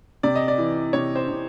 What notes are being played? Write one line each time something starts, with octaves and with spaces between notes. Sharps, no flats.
C3 D5
D#5
D5
E3
C3 C#5
C5
C3